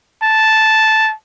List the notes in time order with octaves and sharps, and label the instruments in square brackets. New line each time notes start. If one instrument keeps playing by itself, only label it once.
[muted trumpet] A5